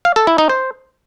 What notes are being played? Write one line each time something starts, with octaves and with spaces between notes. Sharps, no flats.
F5
A4
E4
D#4
C5